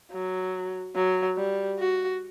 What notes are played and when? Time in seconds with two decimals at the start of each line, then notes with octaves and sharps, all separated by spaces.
0.11 F#3
0.95 F#3
1.37 G3
1.79 F#4